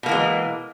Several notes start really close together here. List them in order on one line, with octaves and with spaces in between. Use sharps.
B2 A#3 E3 G#3